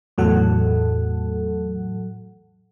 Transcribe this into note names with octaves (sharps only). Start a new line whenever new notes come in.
E2 A2 F#3 A4 F#5